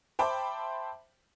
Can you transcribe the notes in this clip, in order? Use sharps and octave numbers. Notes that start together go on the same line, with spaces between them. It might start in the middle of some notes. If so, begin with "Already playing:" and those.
C5 E5 G5 A5 B5 D6